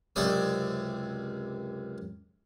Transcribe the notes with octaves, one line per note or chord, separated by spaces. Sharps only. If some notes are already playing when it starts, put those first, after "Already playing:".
C#2 F#2 C3 A4 D5 D#6